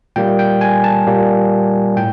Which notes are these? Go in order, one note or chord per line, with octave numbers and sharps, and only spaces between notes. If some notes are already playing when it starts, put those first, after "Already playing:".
A#2 G3 A#3 G5
G5
G#5
A5
A#2 G3 A#3
A2 G5